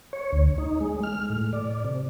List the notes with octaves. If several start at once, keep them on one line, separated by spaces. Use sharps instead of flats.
C#5
D2
D#4
G#3
F6
A2
D5
C3